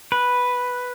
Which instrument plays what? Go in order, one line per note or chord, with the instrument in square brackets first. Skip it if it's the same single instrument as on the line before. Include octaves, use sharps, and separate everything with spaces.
[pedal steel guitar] B4